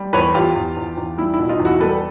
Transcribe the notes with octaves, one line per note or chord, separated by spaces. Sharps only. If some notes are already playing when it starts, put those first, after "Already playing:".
Already playing: G3
E2 B4 C#5
E2 F4 G4
E2
E2
E2
G3 E4
E4
B2
D#4 F4
E2
E4 F#4
G3 A4 B4